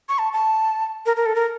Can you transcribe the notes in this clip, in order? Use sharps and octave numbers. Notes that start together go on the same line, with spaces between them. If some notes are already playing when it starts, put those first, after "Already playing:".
C#6
A5
A5
A#4
A#4
A4
A#4